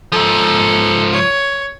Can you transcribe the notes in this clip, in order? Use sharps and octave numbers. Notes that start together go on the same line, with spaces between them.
G#2 F3 A4
C#5